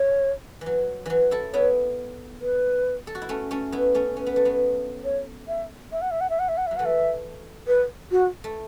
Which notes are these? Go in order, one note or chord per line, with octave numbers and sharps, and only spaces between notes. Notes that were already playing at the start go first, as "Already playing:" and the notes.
Already playing: C#5
E3 F#3
E3 F#3
E4 A4
B3 E4 C#5
B4
A4
F#4
E4
A3 C#4
A3 C#4
B3 E4
A3 C#4
C#4 B4
B3
A3
F#3 B3
C#5
E5
E5
F#5
E5
F#5
E5
F#5
E5
F#5
E5
F#3
E3 A3 F#5
E5
B4
F#4
A3